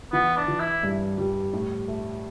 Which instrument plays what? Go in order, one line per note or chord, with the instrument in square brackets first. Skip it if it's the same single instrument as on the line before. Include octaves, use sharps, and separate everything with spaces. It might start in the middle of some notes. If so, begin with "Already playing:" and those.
[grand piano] E3 [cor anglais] B3
[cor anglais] D4
[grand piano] E3
[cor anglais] E4
[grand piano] G2
G3
A2
A3